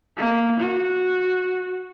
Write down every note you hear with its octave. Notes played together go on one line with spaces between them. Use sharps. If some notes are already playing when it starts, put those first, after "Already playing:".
A#3
F#4